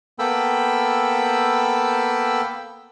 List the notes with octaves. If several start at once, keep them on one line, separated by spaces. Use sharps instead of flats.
A#3 B3 A4 G5 B5 E6